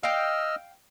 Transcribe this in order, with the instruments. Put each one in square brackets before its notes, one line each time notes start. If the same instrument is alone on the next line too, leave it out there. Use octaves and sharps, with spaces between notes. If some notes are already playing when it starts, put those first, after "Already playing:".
[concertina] D#5 E6 F6 [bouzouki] F5 G5